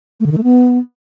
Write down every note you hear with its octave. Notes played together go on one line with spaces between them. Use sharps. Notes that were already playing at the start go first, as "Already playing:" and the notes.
A3
D3
D#3
A3
B3